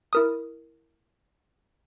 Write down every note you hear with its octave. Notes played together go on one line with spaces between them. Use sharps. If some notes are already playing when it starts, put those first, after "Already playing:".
E4 A#4 D#6